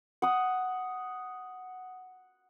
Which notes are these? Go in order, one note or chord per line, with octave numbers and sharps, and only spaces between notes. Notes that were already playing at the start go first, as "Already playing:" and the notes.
F#5 D#6